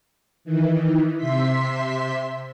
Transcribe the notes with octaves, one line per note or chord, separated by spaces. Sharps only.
D#3 E3
C3 E5 C6 B6